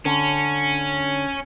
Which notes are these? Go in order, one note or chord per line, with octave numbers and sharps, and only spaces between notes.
D3 C#4